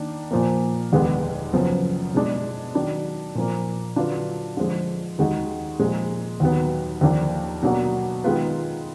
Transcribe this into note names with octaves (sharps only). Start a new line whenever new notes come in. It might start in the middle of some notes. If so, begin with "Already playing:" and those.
Already playing: D#3 A#3 D4
A#2 F3 A#3
F1 D#2 D3 G#3 B3
F#1 F#2 F3 B3
B2 G#3 D4
D#3 F#3 D4
A#2 F3 A#3
D3 F#3 D4 F4 B4
D3 F3 G#3
D#2 D#3 G#3 D#4 F#4
A#2 F3 G#3
D#2 D#3 F#3 B3
D#2 D3 F3 A#3 D4
B2 F#3 A#3 D4 F#4
D#3 G#3 B3 F4 B4